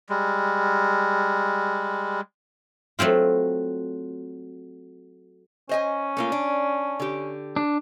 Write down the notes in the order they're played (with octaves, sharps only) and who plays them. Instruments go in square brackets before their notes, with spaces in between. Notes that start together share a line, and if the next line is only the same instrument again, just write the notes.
[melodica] G3 G#3
[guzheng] F#3 A3 C4 F4
[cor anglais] C#4 [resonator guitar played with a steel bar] C5 D#5 G#5
[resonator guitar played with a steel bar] A3 A#3 F4
D4
D3 G4
[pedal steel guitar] D4